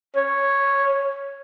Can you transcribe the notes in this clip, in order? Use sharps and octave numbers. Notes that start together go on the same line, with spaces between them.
C#5